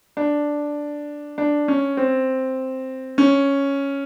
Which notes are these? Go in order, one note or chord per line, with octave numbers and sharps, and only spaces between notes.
D4
D4
C#4
C4
C#4